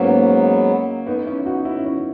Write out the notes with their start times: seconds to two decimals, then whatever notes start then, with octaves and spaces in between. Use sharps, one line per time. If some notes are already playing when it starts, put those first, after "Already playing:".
Already playing: G#2 F#3 A#3 B3 C#4
1.06 B3 D#4
1.26 C#4 E4
1.46 D#4 F#4
1.65 C#4 E4
1.85 C#4 E4